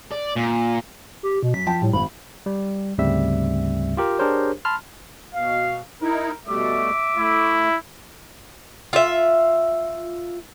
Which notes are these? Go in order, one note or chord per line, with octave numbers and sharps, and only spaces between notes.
D5
A#2
G4
B2
F#2 B6
F3 G5 A5
A2 G3
G#1 B5
G3
D2 G#2 C#3 G3 C4 E5
F4 G4 A#4
D4 G4 G#4 A#4 C5 C#5
A5 B5 C6 F6
B2 F5
D#4 E4 A#4
B2 G3 A3 E5 D6
A3 E4
F4 E5